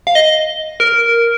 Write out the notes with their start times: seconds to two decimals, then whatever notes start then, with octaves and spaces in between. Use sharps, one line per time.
0.07 F5
0.15 D#5
0.80 A#4